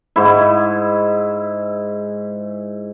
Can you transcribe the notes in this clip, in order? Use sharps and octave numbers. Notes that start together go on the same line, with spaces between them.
G#2 E4